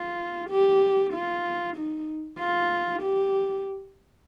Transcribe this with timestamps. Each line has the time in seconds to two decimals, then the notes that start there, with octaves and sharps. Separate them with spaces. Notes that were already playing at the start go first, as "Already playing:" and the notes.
Already playing: F4
0.50 G4
1.13 F4
1.77 D#4
2.39 F4
3.02 G4